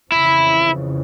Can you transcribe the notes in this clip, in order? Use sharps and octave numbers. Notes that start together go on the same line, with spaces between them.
F2 C#3 E3 E4